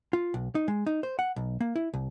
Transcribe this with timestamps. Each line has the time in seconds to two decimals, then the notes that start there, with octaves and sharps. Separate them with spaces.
0.13 F4
0.34 B1
0.55 D#4
0.68 G#3
0.86 D#4
1.03 C5
1.19 F#5
1.36 B1
1.61 A#3
1.76 E4
1.94 C2